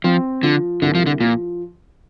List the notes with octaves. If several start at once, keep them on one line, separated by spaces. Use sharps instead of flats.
F3 C4
D3 F3
C2 D3
F3
D3
A#2 F3